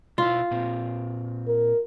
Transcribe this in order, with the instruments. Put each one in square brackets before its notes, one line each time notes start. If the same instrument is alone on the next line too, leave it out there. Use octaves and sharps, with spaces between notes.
[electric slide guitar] B2 E4 [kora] F4
[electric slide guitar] A#2 C4
[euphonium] A#4